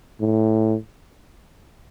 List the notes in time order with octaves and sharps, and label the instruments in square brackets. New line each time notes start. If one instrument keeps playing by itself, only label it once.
[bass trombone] A2